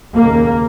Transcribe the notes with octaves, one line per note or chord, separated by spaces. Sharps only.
D#2 C#3 A#3